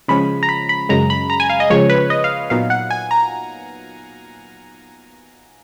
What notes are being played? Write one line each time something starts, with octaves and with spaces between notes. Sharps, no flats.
C#3 F3 G#3 C#4 B5
A#5
B5
B5
F#2 C#3 G#3 A#5
B5
A#5
G#5
F5
D#5
C#3 F3 G#3 C#5
B4
D#5
F5
A#2 F#3 B3 D#4 F5
F#5
G#5
A#5